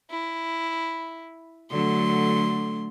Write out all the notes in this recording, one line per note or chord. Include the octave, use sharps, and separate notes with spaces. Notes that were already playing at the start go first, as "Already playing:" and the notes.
E4
D3 F#3 A3 C6